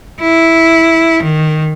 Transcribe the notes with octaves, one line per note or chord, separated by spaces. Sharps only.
E4
D#3